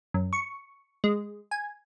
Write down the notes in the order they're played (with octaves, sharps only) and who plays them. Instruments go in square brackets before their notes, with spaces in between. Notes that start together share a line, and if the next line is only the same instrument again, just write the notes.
[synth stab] F#2
C#6
G#3
G#5